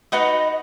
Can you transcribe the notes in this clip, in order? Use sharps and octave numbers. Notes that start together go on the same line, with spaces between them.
D#4 F#4 B4 D#5 F#5